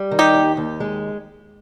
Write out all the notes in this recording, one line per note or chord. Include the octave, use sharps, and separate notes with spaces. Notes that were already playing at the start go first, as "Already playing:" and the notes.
Already playing: G3
D#3
D#4 G4
D#2
D#2
G#3